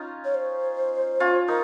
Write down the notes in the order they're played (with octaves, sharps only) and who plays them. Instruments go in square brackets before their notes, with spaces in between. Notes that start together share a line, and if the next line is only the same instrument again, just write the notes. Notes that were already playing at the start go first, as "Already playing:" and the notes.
Already playing: [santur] C#4 D#4 F4
[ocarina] C#5
C5
[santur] C#4 F4
[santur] D#4 [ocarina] A#4